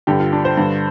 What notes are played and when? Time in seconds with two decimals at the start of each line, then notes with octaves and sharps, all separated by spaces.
0.07 G2 D3 G4
0.19 F4
0.33 D4
0.45 C5
0.57 G2 D3